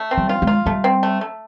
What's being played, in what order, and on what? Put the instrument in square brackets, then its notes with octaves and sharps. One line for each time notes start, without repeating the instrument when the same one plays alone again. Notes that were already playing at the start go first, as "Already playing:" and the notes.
Already playing: [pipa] A3
C4
[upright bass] G3
[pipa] F4
[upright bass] G#3
[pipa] F4
[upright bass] G3 [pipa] A3
[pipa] C4
A3
A3